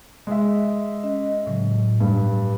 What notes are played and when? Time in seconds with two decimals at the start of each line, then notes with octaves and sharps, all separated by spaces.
0.27 G#3 E5
1.04 C#4 D#5
1.47 A2 C#3 F#3
2.00 G2